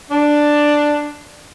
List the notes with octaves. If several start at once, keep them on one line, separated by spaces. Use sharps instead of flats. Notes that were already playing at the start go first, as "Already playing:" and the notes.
D4